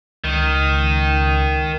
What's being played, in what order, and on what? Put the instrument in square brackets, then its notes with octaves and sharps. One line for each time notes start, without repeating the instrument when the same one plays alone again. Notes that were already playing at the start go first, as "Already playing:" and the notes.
[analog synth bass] C#2 [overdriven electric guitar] D#3